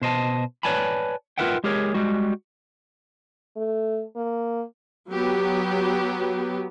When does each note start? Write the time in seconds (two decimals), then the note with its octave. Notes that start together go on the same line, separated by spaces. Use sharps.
0.01 B2 C5 D#5 A5
0.63 B4 C#5 D5 G#5 A5 B5
1.38 F4 A#4 B4 E5 F#5 G5
1.64 G#3 G4 G#4 A#4 C#5
1.94 G3 G#3 F#4
3.56 A3
4.16 A#3
5.10 F#3 B3 G4